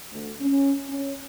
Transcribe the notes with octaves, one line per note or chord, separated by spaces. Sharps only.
D2
C#4
C#4